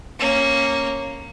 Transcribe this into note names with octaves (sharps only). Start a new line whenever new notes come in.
A#3 C#4